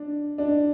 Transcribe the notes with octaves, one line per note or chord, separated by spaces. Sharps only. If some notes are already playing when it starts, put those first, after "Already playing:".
Already playing: D4
D4